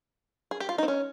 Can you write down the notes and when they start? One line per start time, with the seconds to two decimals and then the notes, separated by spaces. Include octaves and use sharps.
0.51 G#4
0.60 G4
0.69 F4
0.78 D#4
0.83 C4
0.88 C#4